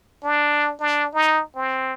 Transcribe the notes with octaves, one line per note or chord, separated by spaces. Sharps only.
D4
D4
D#4
C4